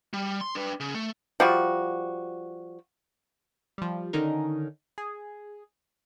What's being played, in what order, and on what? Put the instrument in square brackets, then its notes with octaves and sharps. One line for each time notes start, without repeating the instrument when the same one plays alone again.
[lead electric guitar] G3
C6
D4 B4
C#3
A3
[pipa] F3 G3 F#4
[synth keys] F3 G3
D3 D#3 C#4 D#4 A#4
G#4